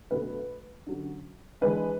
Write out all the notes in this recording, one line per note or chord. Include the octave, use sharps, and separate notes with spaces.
B2 A3 D4 B4
D3 F#3 C#4
E3 G#3 D4 B4